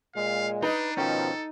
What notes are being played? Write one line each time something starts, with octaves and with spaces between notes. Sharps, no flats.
A#2 G#3 F5
D4 D#4 B4
B2 D#3 F3 C#4 A4 C5 G5